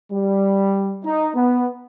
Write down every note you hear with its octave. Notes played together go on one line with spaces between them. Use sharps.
G3
D#4
B3